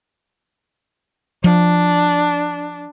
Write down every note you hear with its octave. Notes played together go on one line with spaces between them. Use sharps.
F3 D4